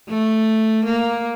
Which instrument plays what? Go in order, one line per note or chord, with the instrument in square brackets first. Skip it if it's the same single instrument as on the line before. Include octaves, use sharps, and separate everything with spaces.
[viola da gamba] A3
A#3